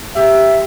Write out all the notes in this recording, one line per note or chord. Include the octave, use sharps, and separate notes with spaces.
G4 E5